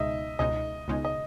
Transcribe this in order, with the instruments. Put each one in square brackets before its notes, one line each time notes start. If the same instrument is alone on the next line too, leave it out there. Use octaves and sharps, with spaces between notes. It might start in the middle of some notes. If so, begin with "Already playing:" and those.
Already playing: [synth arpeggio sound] C#2 B2 G#3 D#4 [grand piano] D#5 E5
[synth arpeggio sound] C#2 B2 G#3 D#4 [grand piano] D#5
[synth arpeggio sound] C#2 B2 G#3 D#4
[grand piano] D#5